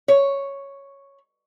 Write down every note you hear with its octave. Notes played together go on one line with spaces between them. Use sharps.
C#5